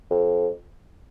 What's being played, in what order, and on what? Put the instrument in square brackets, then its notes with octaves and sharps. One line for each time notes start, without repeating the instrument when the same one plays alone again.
[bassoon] F2